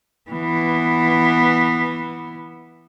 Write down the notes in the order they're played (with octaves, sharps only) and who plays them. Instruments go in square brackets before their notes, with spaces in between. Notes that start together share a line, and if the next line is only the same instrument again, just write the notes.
[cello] E3 B3